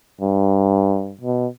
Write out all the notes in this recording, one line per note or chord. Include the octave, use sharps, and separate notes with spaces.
G2
B2